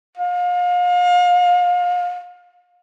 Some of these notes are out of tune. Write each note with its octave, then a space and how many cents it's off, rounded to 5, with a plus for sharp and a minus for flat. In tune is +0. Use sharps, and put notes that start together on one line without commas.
F5 +35